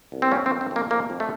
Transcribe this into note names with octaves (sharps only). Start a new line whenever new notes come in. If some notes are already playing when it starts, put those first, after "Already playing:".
C2
C4
F2 C#4
C4
F2
C4
F2 A#3
F2 A#3
F2
A3